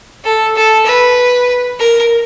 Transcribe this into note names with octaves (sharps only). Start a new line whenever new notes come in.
A4
A4
B4
A#4